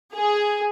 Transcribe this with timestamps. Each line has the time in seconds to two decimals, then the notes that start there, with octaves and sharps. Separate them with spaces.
0.16 G#4